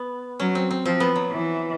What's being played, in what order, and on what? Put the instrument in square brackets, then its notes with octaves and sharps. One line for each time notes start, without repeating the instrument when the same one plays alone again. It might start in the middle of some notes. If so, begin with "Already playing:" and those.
Already playing: [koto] B3
[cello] F#3 [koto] C#4
[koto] C4
C4
[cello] F3 [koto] C4
[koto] B3
F#3
[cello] E3